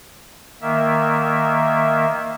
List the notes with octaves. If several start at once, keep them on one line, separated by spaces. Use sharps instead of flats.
D#3 A#3 E5